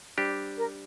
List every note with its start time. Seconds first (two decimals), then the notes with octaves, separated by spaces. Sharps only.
0.18 G3 D4 G4 C5 D5
0.56 A#4